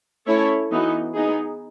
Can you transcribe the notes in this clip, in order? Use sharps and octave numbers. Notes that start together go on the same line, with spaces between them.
A3 C#4 E4 A4 C#5
E3 B3 D#4 F#4
B3 D#4 G#4